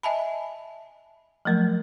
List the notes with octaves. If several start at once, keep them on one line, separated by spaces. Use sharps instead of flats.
D#5 E5 G#5 A5 B5
F3 F#3 A3 A#4